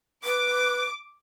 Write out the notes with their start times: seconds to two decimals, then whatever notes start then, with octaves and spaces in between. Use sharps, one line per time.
0.24 B4 D6